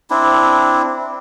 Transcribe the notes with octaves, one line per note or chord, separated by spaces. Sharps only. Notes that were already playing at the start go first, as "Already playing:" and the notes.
C4 D4 E4